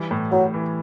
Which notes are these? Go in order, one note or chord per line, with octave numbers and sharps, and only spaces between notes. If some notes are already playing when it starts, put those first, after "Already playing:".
Already playing: E3 G3
A2
A2 F#3
E3